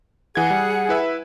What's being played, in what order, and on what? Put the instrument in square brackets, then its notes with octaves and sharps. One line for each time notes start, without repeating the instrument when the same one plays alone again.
[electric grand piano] E3 G#6 [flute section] G#4 F#5
[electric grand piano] G3
E4 B4 E5